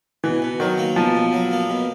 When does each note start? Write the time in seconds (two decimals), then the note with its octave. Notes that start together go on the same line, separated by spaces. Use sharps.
0.24 B2 E3
0.42 B2
0.60 D#3 F#3
0.78 A#3
0.96 B2 F3
1.15 B2
1.33 F#3
1.51 A#3
1.70 B2